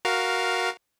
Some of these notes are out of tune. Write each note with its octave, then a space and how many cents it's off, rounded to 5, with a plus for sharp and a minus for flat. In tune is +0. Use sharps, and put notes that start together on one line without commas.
F#4 +0 A#4 +5 F5 +0